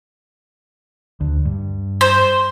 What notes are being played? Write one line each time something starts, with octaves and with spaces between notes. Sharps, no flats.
D2
G2
C5